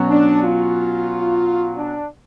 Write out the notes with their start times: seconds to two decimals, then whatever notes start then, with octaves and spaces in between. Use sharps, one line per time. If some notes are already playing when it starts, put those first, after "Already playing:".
Already playing: B2 F#3 C#4 F#4
0.09 D4
0.43 F4
1.77 D4